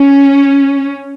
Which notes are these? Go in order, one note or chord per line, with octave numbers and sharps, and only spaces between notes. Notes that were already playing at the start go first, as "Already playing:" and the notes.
Already playing: C#4